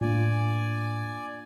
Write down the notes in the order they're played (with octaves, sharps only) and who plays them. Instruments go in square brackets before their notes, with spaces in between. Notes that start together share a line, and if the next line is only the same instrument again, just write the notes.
[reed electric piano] A2 [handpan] A#3 D4 F4 [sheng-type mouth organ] D5 G#5